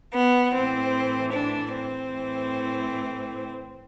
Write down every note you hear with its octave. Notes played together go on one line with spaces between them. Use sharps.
B3
A2 E3 C4
D4
C4
A2 E3